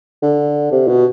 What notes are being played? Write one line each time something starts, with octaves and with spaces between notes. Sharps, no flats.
D3
C3
B2